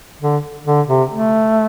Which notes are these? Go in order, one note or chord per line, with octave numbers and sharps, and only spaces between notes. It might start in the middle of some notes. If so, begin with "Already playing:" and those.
D3
D3
C3
A3